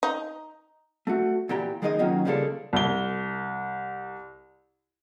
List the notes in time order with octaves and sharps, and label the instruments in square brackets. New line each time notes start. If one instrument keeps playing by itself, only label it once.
[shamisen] D#4
[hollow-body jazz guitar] A3 F#4
A#2 E3 G4 G5 A#5
D#3 G#3 A#3 D#4 D5 D#5
D#3 F#3 A#3 C#4 F4
C#3 G3 G#3 A#3 D4 A4
[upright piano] C2 G7